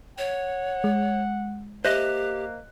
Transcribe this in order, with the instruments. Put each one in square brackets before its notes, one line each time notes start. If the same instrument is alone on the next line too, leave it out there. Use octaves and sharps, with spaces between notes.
[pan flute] C#5 [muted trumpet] F#5
[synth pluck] G#3
[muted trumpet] A#3 [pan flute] G4 [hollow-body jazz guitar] C5 D#5 E5 [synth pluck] F#6